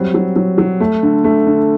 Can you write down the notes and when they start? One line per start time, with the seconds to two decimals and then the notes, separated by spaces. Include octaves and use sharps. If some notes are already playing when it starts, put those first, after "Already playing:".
Already playing: F#3 G3 C4
0.14 F#3
0.36 F#3
0.58 F#3
0.80 A3
1.03 D3
1.24 A3
1.47 D3